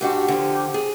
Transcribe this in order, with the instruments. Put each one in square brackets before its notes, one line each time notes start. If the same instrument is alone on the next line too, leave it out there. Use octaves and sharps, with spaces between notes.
[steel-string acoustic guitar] G#2 D4 F#4 [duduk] G4
[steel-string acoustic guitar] D3 F3
G#4